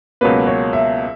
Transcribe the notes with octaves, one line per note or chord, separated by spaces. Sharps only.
C#2 B2 F#3 A#3 B4
C#5
E5